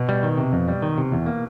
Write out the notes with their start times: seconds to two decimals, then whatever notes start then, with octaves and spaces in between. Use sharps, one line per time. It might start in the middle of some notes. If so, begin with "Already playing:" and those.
Already playing: B2
0.09 G3
0.23 D#3
0.38 C3
0.53 F2
0.68 G3
0.82 D#3
0.98 C3
1.12 E2
1.26 A#3